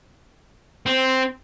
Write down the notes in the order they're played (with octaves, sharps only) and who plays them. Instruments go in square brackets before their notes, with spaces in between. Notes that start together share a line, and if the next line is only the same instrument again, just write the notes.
[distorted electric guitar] C4